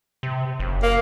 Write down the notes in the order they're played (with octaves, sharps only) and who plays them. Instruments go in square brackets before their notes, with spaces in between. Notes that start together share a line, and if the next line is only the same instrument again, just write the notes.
[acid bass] C3
F#1
[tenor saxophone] A#3